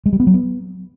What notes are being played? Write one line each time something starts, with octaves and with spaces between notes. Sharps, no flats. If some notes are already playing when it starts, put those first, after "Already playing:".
G#3
G3
B3
F#3
B3